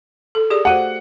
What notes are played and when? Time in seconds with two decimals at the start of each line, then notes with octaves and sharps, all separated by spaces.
0.35 A4
0.50 G4 G#4 D5
0.65 A3 F#4 C5 F#5